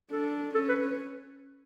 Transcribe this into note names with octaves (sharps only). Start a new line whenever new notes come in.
D4 A4
C#4 A4
B4